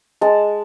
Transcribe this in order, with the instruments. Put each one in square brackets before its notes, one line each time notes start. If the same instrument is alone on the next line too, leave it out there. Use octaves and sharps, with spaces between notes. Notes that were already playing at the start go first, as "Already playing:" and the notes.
[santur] G#3 A5